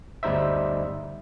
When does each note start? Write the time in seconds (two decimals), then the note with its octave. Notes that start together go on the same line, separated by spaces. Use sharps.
0.23 G1 D2 G3 D#4 C5 E5